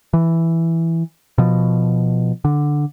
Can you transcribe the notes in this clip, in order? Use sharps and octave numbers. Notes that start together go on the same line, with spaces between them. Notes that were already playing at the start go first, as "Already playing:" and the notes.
E3
B2 F3
D3